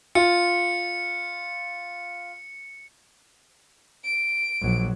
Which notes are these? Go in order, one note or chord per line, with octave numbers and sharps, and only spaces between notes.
F4 C#7
D7
A#1 F#3